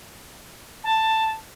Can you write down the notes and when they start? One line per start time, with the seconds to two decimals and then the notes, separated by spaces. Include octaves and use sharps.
0.84 A5